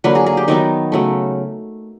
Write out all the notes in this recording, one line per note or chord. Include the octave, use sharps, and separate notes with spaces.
D3 F#3 A#3 B4
G#4
G#4
G4
D#3 F#3 B3 D#4
C#3 F#3 A3